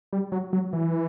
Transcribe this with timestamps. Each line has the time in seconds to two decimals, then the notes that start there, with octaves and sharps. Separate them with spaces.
0.13 G3
0.32 F#3
0.53 F#3
0.73 E3